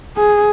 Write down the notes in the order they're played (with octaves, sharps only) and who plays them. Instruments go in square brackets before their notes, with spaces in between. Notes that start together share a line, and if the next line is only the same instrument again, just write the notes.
[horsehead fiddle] G#4